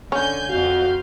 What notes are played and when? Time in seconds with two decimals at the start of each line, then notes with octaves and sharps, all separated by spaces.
0.12 D3 C#4 G#5 G6
0.49 F2 F#4 F5 G6